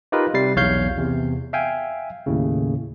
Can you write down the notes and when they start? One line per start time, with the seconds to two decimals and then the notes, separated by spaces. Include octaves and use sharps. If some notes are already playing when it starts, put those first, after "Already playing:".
0.12 D#4 F4 G4 A#4 B4 D#5
0.34 C3 G3 A6 C7
0.56 B1 E2 C#5 F5 G6 C7
0.98 E2 C3
1.53 E5 F5 G5 G#5
2.26 D#2 A2 C#3